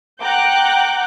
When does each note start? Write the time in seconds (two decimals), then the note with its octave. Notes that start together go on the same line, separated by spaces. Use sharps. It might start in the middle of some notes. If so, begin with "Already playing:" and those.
0.21 F#5 G5 A#5 D6 F#6 G6